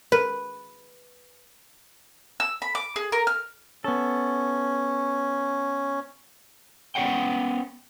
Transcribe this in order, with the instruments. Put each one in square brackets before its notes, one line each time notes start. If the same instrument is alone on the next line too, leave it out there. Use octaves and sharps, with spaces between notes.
[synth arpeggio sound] A#4 [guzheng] B4
[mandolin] E6
B5
D6
G#4
A#4
F6
[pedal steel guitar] B3 A4 [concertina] C#4
[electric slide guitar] B3 C#4 G4 C#5 F#5 G5